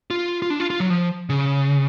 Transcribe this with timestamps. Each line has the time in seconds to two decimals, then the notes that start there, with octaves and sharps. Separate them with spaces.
0.10 F4
0.42 F4
0.50 D4
0.60 F4
0.70 F4
0.80 F#3
0.90 F3
1.30 C#3